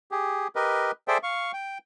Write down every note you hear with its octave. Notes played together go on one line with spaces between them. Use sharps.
G4 G#4
G4 A#4 B4 D#5
G#4 A4 C5 D5 E5 G5
F5 C#6
G5